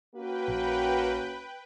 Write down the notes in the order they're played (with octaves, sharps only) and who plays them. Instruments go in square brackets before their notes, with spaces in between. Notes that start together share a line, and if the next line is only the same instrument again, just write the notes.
[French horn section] A#3 C#4 F#4 [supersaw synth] B4 G5
[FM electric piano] A#1